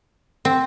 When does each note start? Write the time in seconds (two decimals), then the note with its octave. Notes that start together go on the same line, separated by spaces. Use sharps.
0.45 C4